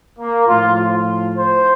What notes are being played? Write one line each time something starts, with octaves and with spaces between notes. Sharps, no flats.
A#3
A2 F3 F4
F4
C5